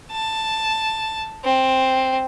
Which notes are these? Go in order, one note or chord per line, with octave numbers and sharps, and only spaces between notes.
A5
C4